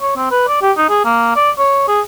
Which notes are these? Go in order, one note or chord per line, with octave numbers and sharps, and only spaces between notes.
C#5
C4
B4
D5
G4
D#4
G#4
A#3
D5
C#5
G#4